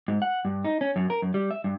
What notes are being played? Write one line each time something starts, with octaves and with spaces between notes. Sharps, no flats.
G#2
F#5
G2
D#4
C#4
F#2
A#4
F#2
G3
E5
G2